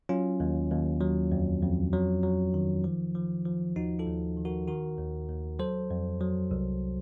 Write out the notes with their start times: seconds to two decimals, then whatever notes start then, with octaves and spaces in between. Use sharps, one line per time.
0.09 F#3 C#4 F4
0.40 D#2
0.71 D#2
1.01 F#3
1.32 F2
1.62 F2
1.93 F#3
2.23 F#3
2.54 D#3
2.84 F3
3.15 F3
3.46 F3
3.76 D#2 D#4 F#4
3.99 F4 A4
4.07 D#2
4.37 D#3
4.45 F#4 A#4
4.68 D#3 F#4 A#4
4.98 D#2
5.29 D#2
5.59 F#3 A4 C5
5.91 F2
6.21 F#3
6.51 C2